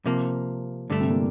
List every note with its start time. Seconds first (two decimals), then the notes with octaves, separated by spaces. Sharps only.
0.06 C3 F3 A#3
0.90 G2 D3 A3 D4
1.00 C3 C4
1.10 A#2 A#3